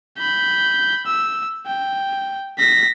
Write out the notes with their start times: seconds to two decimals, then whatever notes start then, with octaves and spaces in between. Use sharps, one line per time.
0.18 B5 G6
1.06 E6
1.67 G5
2.58 A#6 B6